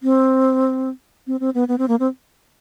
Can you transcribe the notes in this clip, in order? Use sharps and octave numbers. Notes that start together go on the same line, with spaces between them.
C4
C4
C4
B3
B3
C4
A#3
C4